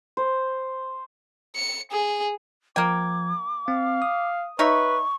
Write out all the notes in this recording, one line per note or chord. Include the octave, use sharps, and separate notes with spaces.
C5
C#7
G#4
F3 A#3 G5 D6 G#6
C4 F5
D#6
D#4 B4 C#5 E5 C#6